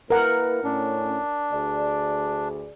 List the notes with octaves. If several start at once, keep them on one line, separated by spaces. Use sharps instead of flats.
A#3 E4 A#4 B4 F#5
A2 A3 C#4 D4
D2 G#4 D5